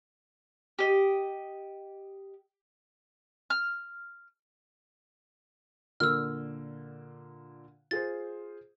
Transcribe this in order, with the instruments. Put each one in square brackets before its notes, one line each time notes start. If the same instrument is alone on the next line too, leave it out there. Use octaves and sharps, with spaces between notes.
[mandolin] G4 D#5
F6
[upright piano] A#2 D3 A#3 [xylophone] E6 F6
[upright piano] F4 G#4 C5 [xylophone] A6